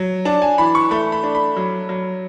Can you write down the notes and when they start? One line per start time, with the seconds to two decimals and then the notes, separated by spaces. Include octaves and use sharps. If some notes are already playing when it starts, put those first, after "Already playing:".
Already playing: F#3
0.25 D4 A5
0.42 G#5
0.58 E3 B5
0.75 C#6
0.91 A3 B5
1.12 B5
1.23 D4
1.35 B5
1.57 F#3
1.89 F#3